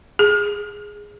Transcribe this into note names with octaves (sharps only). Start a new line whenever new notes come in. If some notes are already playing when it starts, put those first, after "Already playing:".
G#4